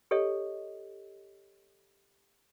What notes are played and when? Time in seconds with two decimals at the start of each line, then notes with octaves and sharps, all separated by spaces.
0.11 G4 A4 C#5 D#5